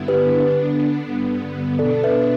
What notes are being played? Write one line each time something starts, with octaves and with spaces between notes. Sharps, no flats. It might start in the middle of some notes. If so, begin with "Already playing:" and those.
Already playing: G2 D3 B3 E4
G4 B4
D3 B3 D4
G2 D3 B3
B2 B3 D4 A4 D5
B4 E5